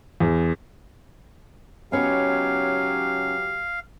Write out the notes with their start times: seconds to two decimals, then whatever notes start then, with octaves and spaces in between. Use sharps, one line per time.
0.20 E2
1.92 C#2 F#3 B3 C#4 D#4 G4 F5